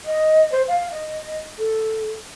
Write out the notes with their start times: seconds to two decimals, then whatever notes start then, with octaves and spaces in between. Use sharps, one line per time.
0.05 D#5
0.52 C5
0.68 F5
0.92 D#5
1.58 A4